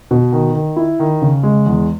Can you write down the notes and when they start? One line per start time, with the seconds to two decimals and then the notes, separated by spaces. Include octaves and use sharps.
0.11 B2
0.32 D#3
0.55 D#3
0.76 E4
0.99 D#3
1.22 C#3
1.43 G#3
1.66 E2